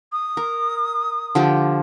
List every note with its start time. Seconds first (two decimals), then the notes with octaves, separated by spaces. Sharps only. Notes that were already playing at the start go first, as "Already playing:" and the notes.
0.12 D#6
0.37 A#4
1.35 D3 F3 G4